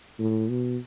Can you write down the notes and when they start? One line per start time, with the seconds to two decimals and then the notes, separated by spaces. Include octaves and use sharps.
0.19 A2
0.50 B2